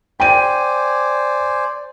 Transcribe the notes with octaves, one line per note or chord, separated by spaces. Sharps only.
C5 D5 G5 G#5 D#7